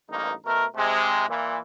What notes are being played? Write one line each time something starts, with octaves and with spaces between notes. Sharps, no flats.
A1 G2 A#3 D#4
B2 A3 A#4
C3 G#3
A#2 E3